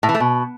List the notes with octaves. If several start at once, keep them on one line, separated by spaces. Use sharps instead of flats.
A2
E3
A3
B2